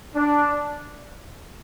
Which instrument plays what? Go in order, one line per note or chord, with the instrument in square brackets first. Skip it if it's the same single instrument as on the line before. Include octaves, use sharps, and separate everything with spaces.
[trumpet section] D4